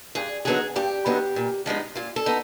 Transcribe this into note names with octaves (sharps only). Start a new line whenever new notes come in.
G2 G#4
D3 F#3 B3 D#4 G#4
G2 G4
D3 F#3 B3 D#4
A#2
F3 G#3 B3 D#4
A#2 F4
A4
B3 D#4